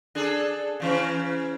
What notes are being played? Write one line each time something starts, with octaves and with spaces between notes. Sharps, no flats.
D4 G#4 A4
C#3 E3 C#4